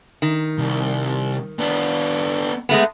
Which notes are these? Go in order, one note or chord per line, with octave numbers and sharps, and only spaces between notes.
D#3
C2
B3 D4
G#3 A3 B3